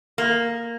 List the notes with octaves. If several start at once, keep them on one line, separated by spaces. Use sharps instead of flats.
A#3